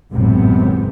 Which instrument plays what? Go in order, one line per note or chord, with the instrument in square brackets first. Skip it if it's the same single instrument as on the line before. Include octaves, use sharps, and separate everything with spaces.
[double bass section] G#1 C#2 F#2 A2 C3 B3